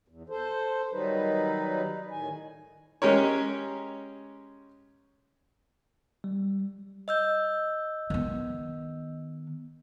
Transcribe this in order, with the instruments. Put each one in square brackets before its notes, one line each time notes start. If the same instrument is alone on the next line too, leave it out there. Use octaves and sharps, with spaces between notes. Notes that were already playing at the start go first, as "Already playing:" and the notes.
[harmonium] E2
A4 C5
D#3 F#3 G3 D#4 B4
A2 D#3 G#5
[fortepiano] G#3 C#4 G4 A#4 C#5
[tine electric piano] G3
[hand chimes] D#5 E6 G6
[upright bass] D#3 B3